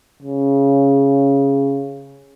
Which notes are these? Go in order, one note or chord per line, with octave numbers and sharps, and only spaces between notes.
C#3